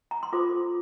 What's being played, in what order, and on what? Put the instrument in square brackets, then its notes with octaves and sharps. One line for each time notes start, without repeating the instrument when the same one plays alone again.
[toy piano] A#5
C6
F4 A4 C5 D6